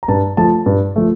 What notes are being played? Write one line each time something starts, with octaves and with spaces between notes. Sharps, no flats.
A#5
G2 A5
F3 A3 A5
G2
F3 A3